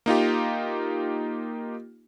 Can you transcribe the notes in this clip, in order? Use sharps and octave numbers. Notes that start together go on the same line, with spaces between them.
A#3 D#4 F4 G4